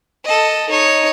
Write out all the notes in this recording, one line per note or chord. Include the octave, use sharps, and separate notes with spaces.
A4 D#5
D#4 C#5